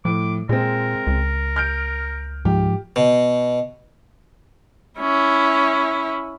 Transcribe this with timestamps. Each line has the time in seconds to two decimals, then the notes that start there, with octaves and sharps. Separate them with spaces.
0.05 A2 F3 D6
0.49 A#2 G#3 C4 A#4
1.07 C#2
1.56 F6 G6 D7
2.45 G#2 F3 G4
2.96 B2
5.00 C#4 E4